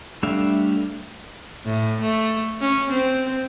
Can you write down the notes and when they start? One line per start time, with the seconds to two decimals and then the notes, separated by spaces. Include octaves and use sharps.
0.23 G3 A3 D4 E5 F5
1.66 A2
2.01 A3
2.60 C#4
2.90 C4